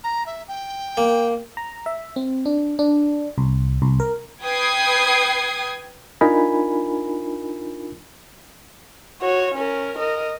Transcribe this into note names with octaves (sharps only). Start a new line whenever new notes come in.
A#5
E5
G5
A#3
A#5
E5
C4
D4
D4
C2
C2
A#4
B4 G5 D#6 G#6 C7
D4 D#4 F4 A#4 G#5 B5
F#4 C#5
C#4 A#4
A#4 D#5